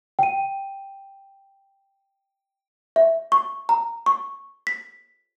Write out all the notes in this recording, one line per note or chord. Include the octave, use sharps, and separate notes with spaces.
G5 D#7
E5
C#6
A#5
C#6
B6